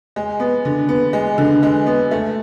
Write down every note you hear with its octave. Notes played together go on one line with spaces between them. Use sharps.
G#3
B3
D3
B3
G#3
D3
G#3
B3
A3